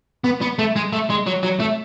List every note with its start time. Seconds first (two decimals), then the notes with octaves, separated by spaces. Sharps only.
0.24 B3
0.41 B3
0.59 A3
0.76 G#3
0.93 A3
1.10 G#3
1.26 F#3
1.43 F#3
1.60 A3